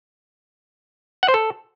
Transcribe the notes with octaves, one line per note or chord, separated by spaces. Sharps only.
F#5
C5
A4